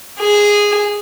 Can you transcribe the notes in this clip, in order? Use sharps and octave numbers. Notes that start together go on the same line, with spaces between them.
G#4